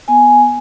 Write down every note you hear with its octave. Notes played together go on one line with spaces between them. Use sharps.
B3 G#5